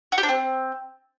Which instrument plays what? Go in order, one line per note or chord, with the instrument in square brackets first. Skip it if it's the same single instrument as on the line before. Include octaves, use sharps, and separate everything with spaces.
[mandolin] F#4
G4
D4
C4